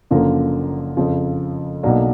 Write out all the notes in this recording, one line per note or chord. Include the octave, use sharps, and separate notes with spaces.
F#1 F#2 D3 F3 A#3
F2 C#3 F3
B1 B2 F#3 A#3 D4